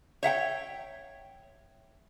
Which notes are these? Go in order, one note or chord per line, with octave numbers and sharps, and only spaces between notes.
C#5 E5 F#5 G5